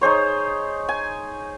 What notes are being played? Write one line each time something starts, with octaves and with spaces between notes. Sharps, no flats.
D#4 G#4 C5 C#5
G#5